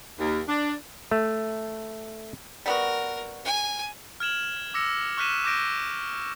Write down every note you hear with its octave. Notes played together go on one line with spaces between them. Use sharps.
D#2
D4
A3
G3 B3 F#4 A#4
G#5
F6 G#6 E7 F#7
D6 E6 A#6 C#7
C#6 F6 F#6 B6 D#7 E7
D6 G6 A#6 D7